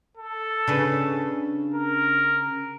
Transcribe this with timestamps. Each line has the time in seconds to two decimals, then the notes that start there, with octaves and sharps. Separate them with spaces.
0.17 A4
0.68 C#3 D4 B4
1.74 A#4